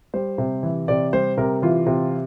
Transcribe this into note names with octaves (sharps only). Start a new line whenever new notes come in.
G3 C5
C3
E3
C3 D5
G3 C5
C3 A#4
E3 F4
C3